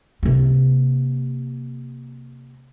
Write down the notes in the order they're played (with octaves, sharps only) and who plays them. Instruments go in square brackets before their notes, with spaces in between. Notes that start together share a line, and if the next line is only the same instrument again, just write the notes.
[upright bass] C3 A#3